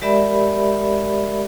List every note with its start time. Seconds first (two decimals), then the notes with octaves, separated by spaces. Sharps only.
0.02 G#3 G4 A#4 D5 E5 B5